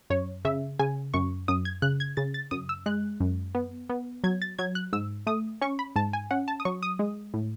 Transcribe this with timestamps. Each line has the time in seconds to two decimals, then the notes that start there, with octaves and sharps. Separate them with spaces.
0.10 F#2 C#5
0.45 C#3 E5
0.79 C#3 G#5
1.14 F#2 C#6
1.48 F#2 D#6
1.65 G#6
1.82 C#3 F#6
2.00 G#6
2.17 C#3 A6
2.34 A6
2.51 F#2 D#6
2.69 E6
2.86 G#3 F#6
3.20 F#2
3.55 B3
3.90 B3
4.24 F#3 G#6
4.42 A6
4.58 F#3 G#6
4.75 F#6
4.93 G#2 E6
5.27 A3 D#6
5.61 C#4 C#6
5.79 B5
5.96 G#2 A5
6.13 G#5
6.31 C#4 F#5
6.48 A5
6.60 D#6
6.65 F#3 C#6
6.83 D#6
6.99 G#3
7.34 A2